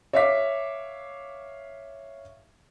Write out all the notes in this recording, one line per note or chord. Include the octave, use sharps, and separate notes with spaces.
C#5 E5 F5 D6 B6